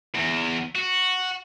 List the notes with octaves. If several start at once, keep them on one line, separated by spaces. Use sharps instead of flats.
E2
F#4